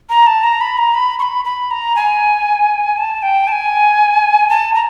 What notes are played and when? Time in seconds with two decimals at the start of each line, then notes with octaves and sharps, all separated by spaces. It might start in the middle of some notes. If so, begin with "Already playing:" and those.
0.10 A#5
0.27 A5
0.43 A#5
0.61 B5
0.78 A#5
0.94 B5
1.19 C#6
1.22 B5
1.45 B5
1.71 A#5
1.96 G#5
2.97 A5
3.22 G5
3.48 A5
3.52 G#5
4.49 A5
4.75 A#5